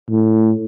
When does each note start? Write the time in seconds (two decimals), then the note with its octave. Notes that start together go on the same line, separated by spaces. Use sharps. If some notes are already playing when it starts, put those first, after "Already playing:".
0.10 A2